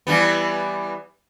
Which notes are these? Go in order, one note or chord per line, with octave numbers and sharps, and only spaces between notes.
E3 G3 B3